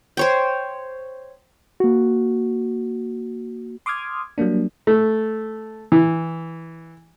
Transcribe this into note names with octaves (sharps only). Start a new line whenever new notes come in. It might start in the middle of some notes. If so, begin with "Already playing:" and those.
C5 C#5 G5
A#3 F#4
C6 D6 D#6 F6 G#6
F#3 G3 A#3 D4
A3
E3